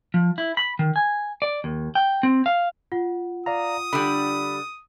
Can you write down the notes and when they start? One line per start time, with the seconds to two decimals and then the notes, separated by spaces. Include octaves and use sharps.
0.14 F3
0.38 E4
0.57 B5
0.79 D#3
0.96 G#5
1.42 D5
1.64 D#2
1.95 G5
2.23 C4
2.46 F5
2.92 F4 F#5
3.46 D5 F5 A#5 D#6
3.93 D3 G3 B5